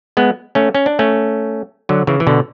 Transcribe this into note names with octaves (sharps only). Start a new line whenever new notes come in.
G#3 B3
A3 C#4
C#4
D4
A3 C#4
D3 F#3
C#3 E3
E3
B2 D3